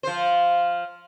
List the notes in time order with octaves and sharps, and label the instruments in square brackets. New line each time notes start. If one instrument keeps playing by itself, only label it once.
[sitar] F3 C5